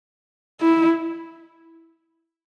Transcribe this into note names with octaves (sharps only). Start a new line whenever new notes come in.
E4